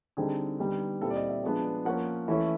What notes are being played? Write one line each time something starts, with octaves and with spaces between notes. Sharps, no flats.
D3 G3 C4 D#4 G#4
D3 G3 B3 D#4
A#2 G3 C4 E4 A4
D5
D#5
E5
F3 G#3 B3 D4
F3 A#3 C#4 F#5
E3 A3 C#4 E4